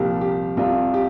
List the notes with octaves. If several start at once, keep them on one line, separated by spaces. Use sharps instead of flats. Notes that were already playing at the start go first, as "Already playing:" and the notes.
Already playing: C2 A#2 F3 A#3 G4
G4
C2 C3 G3 F4
G4